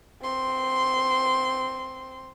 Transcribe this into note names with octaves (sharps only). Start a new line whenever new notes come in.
C4 C6